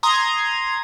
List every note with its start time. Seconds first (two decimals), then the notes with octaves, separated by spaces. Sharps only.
0.03 A#5 C6 D#6 G#6